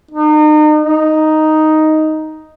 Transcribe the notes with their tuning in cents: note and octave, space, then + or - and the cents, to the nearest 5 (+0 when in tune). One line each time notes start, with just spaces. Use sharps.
D#4 -35
D#4 +0